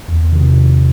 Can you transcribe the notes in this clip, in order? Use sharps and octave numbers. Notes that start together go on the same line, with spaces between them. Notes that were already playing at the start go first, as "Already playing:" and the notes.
E2
C3 D#3